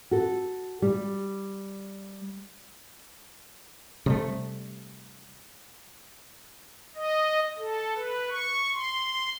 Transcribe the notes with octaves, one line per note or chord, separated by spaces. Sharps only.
F#4 A4
G3
C3 G3 A3
D#5
A4
B4
C#6
C6